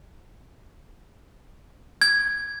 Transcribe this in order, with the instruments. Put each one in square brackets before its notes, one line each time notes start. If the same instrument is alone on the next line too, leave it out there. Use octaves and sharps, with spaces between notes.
[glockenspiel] G#6